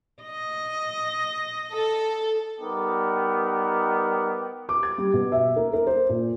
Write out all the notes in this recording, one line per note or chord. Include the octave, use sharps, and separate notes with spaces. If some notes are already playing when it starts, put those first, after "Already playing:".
D#5
A4
G3 B3 D#4 A#4 G5 D6
D6
G#6
G3
B2
E5
A#4
A#4
C5
A#2